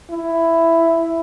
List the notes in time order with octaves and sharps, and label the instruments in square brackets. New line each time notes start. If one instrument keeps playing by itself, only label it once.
[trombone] E4